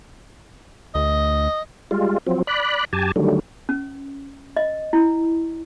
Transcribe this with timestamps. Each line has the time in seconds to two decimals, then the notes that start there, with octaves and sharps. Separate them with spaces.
0.95 D2 D#5
1.91 G3 G#3 F4
2.27 F3 F#3 C4
2.47 D5 B5 F#6
2.93 F#2 G4 G#5 A5
3.16 D3 D#3 F#3 G3 A3
3.69 C#4
4.57 D#5
4.93 E4